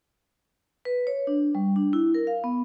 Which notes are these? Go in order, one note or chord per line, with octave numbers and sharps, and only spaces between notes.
B4
C#5
D4
G3
D4
E4
A#4
F5
B3